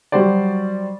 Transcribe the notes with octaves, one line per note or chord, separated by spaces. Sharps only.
F#3 G3 F#4 G4 C5 D5